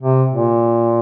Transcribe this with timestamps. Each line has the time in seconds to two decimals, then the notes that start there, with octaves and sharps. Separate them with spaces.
0.02 C3
0.32 A#2